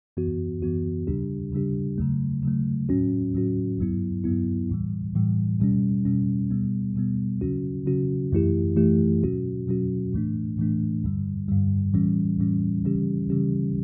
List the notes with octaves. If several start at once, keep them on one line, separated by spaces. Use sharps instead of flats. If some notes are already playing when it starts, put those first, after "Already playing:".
F#2 E3 B3 F#4
F#2 E3 B3 F#4
C#3 G3 D4 G4
C#3 G3 D4 G4
C#3 F#3 A3
C#3 F#3 A3
A2 F#3 C#4 F#4
A2 F#3 C#4 F#4
G2 F#3 B3 E4
G2 F#3 B3 E4
A2 E3 G3
A2 E3 G3
B2 G3 C#4
B2 G3 C#4
B2 G3 B3
B2 G3 B3
C#3 F#3 C#4 F#4
C#3 F#3 C#4 F#4
F#2 E3 A3 E4 G4
F#2 E3 A3 E4 G4
B2 F#3 C#4 F#4
B2 F#3 C#4 F#4
A2 E3 A3 D4
A2 E3 A3 D4
G2 D3 G3
G2 D3 G3
A2 E3 G3 C#4
A2 E3 G3 C#4
C#3 E3 G3 C#4 G4
C#3 E3 G3 C#4 G4